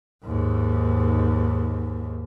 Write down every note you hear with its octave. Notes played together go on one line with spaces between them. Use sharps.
D#2 G#2